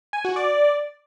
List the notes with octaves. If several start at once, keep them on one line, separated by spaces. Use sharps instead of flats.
G#5
F#4
D5